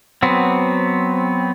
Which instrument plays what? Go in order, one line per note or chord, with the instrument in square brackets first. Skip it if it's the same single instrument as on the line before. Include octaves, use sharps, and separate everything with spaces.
[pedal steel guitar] F#3 B3 C4